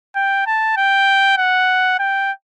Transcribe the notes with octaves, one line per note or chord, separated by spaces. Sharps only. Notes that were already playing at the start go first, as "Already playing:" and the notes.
G5
A5
G5
F#5
G5